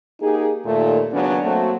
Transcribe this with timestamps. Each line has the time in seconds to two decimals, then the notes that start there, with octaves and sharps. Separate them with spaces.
0.21 A#3 D#4 G4 G#4
0.65 D#2 A#2 A3
1.12 D#2 C#3 F#3 B3 C#4 D4
1.44 F#3 A3 A#3 C4 F#4